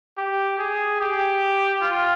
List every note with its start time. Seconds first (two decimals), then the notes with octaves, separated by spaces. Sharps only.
0.18 G4
0.58 G#4
1.00 G4
1.82 F4